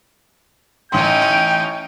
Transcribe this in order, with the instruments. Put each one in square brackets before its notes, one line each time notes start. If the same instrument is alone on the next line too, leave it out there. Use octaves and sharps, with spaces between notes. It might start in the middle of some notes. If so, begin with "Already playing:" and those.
[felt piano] A1 C6 [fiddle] C#4 D#4 [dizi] G5 [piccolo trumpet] G6